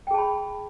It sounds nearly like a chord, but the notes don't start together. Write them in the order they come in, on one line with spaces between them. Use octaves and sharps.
G5 G#4 A5 B5